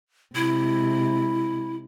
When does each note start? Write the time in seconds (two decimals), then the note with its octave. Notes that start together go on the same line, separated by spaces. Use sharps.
0.35 C3 G#3 E4